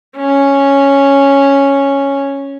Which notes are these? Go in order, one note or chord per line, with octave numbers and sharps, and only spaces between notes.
C#4